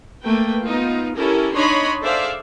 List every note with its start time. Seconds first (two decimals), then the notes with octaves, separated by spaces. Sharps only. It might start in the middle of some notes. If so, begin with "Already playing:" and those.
0.21 A3 A#3 B4 G5
0.64 B3 D#4 F4
1.16 C#4 E4 G4 A4 A#4
1.55 D4 D#4 C#5 D#5 B5 C6
2.01 G#4 A4 C5 D5 E5 F5